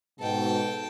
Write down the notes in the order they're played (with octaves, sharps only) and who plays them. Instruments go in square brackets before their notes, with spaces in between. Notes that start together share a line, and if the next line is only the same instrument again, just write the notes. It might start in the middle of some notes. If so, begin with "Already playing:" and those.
[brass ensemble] G#2 B2 [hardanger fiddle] A4 G5